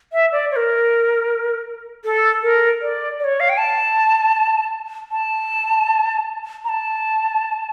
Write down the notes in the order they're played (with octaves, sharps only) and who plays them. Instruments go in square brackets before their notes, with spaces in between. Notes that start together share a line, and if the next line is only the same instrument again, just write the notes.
[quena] E5
D5
C#5
A#4
A4
A#4
D5
D5
C#5
F5
G5
A5
A5
A#5
A5